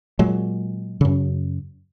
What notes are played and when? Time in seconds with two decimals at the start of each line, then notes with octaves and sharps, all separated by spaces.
0.19 A#2 F#3 G#3
1.01 F#2 C#3